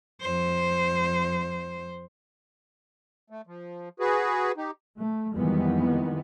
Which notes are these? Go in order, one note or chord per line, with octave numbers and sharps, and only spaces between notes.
F2 C5
A3
F3
F#4 G#4 B4
D#4 G4
A3
F2 D#3 E3 G3 G#3 B3